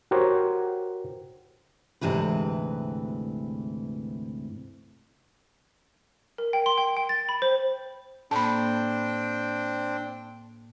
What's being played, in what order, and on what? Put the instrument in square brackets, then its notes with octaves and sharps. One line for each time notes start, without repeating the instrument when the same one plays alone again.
[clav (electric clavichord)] F#4 G4 A#4 C5 C#5
[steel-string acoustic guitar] D2 G#2 C3 E3 B4
[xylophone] A#4
G5
C6
G5
G5
A6
B5
C5
[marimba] A2 A#3 [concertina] C4 D4 G5 [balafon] A5 B5